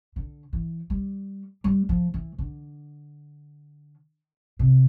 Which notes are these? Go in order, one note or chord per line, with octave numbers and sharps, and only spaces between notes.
D3
E3
G3
G3
F3
E3
D3
C3